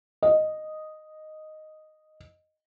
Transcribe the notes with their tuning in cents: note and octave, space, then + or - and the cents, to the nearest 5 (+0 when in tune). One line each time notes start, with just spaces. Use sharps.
D#5 -5